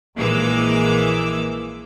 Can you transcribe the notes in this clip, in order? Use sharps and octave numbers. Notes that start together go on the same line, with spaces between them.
A#1 E3 G#3 A#3 D6 E6